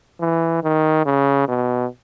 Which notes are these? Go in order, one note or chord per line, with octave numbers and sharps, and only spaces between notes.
E3
D#3
C#3
B2